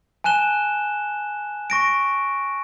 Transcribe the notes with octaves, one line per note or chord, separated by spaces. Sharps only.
G#5 A5 F#6 E7 G7
C#6 A#6 D7